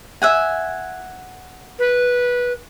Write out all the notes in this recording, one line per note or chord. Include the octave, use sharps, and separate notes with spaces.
E5 F#5 G#5
B4